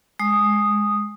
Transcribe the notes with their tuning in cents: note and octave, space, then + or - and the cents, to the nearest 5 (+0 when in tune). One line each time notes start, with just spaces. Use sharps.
G#3 +0 D#6 -5